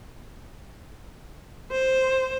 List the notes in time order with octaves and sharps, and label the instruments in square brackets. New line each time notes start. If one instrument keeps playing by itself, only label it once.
[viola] C5